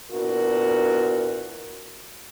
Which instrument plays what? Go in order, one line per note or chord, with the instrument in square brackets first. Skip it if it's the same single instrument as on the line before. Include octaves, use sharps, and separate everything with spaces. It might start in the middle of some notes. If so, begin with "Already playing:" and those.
[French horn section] A#2 B3 D4 E4 F#4 A#4